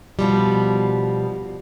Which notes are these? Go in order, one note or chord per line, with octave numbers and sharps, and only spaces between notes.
B2 F3 G3